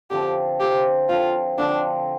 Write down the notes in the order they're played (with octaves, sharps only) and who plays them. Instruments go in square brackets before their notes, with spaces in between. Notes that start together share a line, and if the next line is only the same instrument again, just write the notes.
[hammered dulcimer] D3 F3 C4 [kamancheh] G4
[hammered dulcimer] D3 F3 C4 [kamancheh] G4
[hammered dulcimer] D3 F3 C4 [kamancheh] F4
[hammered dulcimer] D3 F3 C4 [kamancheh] D4